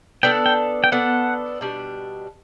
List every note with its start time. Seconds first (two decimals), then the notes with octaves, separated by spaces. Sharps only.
0.23 B3 D4 A4 D5 G5
0.46 G5
0.84 G5
0.92 B3 D4 A4 D5 F#5
1.61 B2 G3 D4